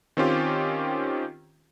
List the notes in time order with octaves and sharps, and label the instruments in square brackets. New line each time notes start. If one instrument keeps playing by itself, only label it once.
[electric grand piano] D#3 C4 C#4 F4 G4